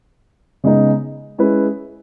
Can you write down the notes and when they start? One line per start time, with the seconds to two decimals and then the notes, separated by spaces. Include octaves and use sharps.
0.64 C#3 G#3 B3 D#4
1.38 G#3 C#4 E4 G#4 B4